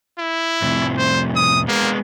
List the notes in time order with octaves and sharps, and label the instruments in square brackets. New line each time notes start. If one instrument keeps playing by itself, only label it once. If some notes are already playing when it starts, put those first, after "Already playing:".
[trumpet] E4
[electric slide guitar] F2 A2 C3
[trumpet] C5
D#6
[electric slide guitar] G#3 B3 [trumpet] A#3